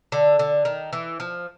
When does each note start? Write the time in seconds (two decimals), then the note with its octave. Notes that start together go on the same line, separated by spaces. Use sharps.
0.12 D3
0.39 D3
0.65 D#3
0.93 E3
1.20 F3